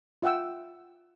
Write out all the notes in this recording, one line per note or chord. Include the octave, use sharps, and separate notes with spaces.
F4 E5 F#5 G5 E6